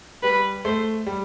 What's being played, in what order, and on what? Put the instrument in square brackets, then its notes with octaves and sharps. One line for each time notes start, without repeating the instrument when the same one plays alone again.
[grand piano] G3 [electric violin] B4
[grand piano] A3 [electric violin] C5
[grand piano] G3